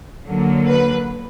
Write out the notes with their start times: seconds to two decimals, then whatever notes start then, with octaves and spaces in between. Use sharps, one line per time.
0.26 D3 F#3 A#3
0.66 B4